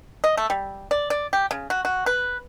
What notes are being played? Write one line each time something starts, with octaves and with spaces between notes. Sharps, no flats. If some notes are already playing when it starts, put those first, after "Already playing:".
D#5
A3
G3
D5
D5
G4
C#3
F#4
F#4
B4